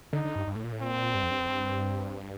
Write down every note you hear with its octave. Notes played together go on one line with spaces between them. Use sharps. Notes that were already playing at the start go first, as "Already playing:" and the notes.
D3 D#4
D3
G2
G2
A2
A#2
A2
A#2 C4
G2
F2
G2
F2
G2